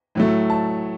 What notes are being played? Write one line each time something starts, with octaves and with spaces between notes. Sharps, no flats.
A2 F#3 A3
A5